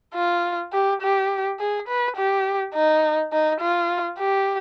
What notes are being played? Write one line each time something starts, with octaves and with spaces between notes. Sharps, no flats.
F4
G4
G4
G#4
B4
G4
D#4
D#4
F4
G4